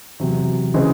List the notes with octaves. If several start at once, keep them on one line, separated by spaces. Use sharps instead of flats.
E2 C3 F#3
C#3 E3 G#3 C4